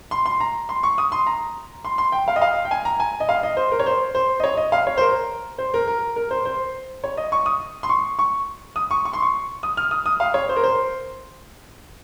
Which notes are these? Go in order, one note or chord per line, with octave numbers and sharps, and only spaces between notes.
C6
C6
A#5
C6
C#6
D#6
C6
A#5
C6
C6
G5
F5
D#5
F5
G5
G#5
A#5
G#5
D#5
F5
D#5
C5
A#4
C#5
C5
C5
D#5
C#5
D#5
F5
C#5
C5
A#4
C5
A#4
A#4
A#4
C5
C5
C#5
D#5
C#6
D#6
C6
C#6
C#6
D#6
C#6
C#6
C6
C#6
D#6
F6
D#6
D#6
F5
C#5
C5
A#4
C5